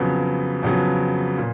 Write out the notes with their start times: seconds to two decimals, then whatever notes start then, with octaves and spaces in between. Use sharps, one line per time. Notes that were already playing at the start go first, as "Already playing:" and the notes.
Already playing: F2 C#3 F#3 B3
0.63 F2 C#3 F#3 B3
1.38 A#2